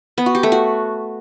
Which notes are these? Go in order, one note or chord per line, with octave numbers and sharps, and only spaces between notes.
B3
F#4
G4
A3
F#4